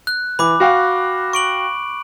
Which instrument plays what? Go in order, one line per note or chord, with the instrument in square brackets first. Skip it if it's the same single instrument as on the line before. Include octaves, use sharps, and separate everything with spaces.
[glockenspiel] F#6
[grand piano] E3 [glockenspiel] B5 D6
[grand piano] F#4 F5 G5
[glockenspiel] C#6 D7 F#7